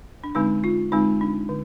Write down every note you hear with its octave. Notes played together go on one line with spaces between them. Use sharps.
D4
D3 G#3 C4 D#4
F4
D3 G#3 C4 D#4
D4
D3